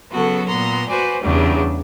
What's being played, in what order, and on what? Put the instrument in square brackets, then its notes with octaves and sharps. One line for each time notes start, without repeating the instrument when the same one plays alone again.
[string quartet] C#3 F#3 B3 F#4 A4
A#2 B3 A#5 C6
F#4 B4 C5 D5 G#5
E2 G2 C#3 F#3 G3 D4